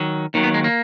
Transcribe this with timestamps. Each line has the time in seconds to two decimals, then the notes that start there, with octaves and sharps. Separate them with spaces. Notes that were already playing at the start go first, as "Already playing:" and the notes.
Already playing: D#3 F#3
0.34 D#2 D#3 F#3
0.44 B3
0.54 G#3
0.64 A#3